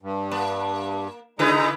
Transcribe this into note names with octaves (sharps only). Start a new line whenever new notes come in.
G2
A#3
C#3 G#3 D#4 E4 B4 A#5